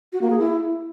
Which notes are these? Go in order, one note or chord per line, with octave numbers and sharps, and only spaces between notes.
F#4
A#3
G#4
E4